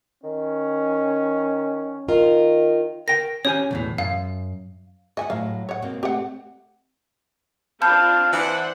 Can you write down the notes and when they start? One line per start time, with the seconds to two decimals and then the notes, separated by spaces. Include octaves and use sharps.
0.23 D#3 C#4
2.09 D#3 F4 A#4
3.08 A#4 G5 A#6
3.45 C#4 G4 C#5 G#5
3.71 B1 E2 A2
3.98 F#2 F5
5.17 D#5 E5 F#5 G#5
5.30 A2 F#3 F5
5.69 C#5 F#5
5.82 B2 A#3 C4
6.03 A3 C4 G4 F#5
7.82 C4 D4 F4 F5 A5 B5 G6
8.33 E3 D4 C5 F#5